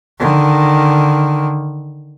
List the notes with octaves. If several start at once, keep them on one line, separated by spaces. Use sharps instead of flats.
D3 D#3